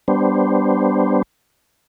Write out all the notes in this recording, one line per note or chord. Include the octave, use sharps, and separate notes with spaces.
G3 B3 D4 C5